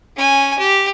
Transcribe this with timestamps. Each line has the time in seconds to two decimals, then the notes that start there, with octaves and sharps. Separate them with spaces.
0.16 C#4 G#5
0.58 G4